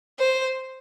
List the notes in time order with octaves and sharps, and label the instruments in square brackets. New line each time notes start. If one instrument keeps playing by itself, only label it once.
[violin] C5